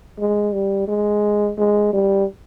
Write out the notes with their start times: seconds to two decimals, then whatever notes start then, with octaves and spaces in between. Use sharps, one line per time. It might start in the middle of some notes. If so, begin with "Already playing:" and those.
0.19 G#3
0.54 G3
0.88 G#3
1.58 G#3
1.93 G3